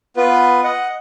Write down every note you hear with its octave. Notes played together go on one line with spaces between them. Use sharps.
B3 F4 B4
D#5 F#5